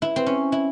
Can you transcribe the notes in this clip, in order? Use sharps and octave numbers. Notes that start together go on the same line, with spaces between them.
E4
C4
C#4
E4